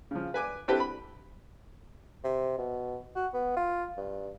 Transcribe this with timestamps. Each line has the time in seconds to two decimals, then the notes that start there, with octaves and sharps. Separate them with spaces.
0.11 C#3 F3
0.34 B4 G#5 D6
0.68 C4 D4 E4 G4 A4 B4
0.80 B5
2.24 C3
2.58 B2
3.15 F#4
3.34 B3
3.56 F4
3.97 G2